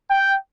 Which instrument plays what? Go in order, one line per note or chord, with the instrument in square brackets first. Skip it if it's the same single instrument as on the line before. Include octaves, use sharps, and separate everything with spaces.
[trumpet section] G5